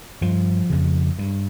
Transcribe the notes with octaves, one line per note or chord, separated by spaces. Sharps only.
G2 F3
F2 C#3
G2